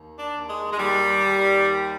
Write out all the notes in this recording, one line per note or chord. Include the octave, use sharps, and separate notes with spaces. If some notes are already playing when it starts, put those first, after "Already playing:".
Already playing: D#2
D4
D#2
G#3
G#3
D#2 G3
D#2
D#3